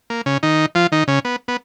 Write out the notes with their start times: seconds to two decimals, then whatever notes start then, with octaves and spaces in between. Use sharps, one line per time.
0.10 A#3
0.26 C#3 C#4
0.43 D#3 D#4
0.75 F3 F4
0.92 D#3 D#4
1.08 C#3 C#4
1.25 B3
1.48 B3